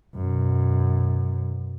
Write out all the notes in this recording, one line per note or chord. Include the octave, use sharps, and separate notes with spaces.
F#2 B2